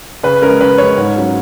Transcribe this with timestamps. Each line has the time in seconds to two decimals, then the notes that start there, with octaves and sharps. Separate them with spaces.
0.23 C#3 B4
0.42 G#3 C#4 A#4
0.61 C#3 B4
0.78 G#3 C#4 C#5
0.97 G#2
1.16 F#3 C#4